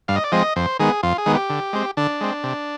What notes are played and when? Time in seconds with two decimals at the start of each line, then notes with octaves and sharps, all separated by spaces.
0.08 G2 F5
0.16 D#5
0.24 D5
0.32 F3 G#3 C4 D#5
0.56 F2 C5
0.79 D#3 G#3 B3 G#4
1.03 F2 F4
1.18 G#4
1.26 D#3 G#3 B3
1.35 G4
1.50 D3
1.73 G#3 C4
1.97 D3 D4
2.21 G#3 C4
2.44 C3